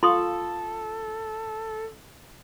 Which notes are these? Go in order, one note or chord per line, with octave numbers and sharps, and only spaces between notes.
F4 A4 C6 C#6 D#6